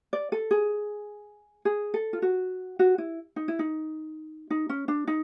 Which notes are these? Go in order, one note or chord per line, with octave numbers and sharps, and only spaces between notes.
D5
A4
G#4
G#4
A4
F4
F#4
F#4
E4
D#4
E4
D#4
D#4
C#4
D4
D#4